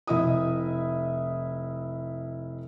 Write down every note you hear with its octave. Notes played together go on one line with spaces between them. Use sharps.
F1 E4 D#5 E5 D#6